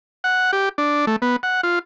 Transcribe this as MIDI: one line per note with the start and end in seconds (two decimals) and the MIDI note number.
0.24 0.51 78
0.53 0.69 67
0.78 1.05 62
1.07 1.16 57
1.22 1.36 59
1.43 1.61 78
1.63 1.79 65